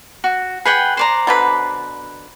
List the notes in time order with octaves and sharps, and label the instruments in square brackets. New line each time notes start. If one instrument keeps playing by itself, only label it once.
[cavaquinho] F#4
[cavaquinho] G#4 F#5 G5 [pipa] B4
[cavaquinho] C5 D5 A#5
[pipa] B2 D3 B4